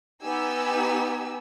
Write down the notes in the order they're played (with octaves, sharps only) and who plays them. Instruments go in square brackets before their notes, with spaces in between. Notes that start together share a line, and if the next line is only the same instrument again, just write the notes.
[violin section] B3 D#4 G4 G#5 E6